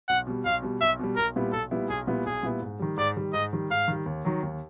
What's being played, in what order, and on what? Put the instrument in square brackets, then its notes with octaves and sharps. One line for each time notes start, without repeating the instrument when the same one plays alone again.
[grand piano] B1 [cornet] F#5
[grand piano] B2 G3
[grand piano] B1 [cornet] F5
[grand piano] B2 G3
[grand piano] B1 [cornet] E5
[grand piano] B2 G3
[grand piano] B1 [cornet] A#4
[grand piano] A#2 G3 B3 E4
[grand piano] B1 [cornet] A4
[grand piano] A#2 G3 B3 E4
[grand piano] B1 [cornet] G#4
[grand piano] A#2 G3 B3 E4
[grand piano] B1 [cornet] G#4
[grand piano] A#2 G3 B3 E4
G#2
D#3 G3
[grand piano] G#2 [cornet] D5
[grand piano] D#3 G3
[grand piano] G#2 [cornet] D#5
[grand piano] D#3 G3
[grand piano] G#2 [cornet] F5
[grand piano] D#3 G3
D#2
D#3 F#3
D#2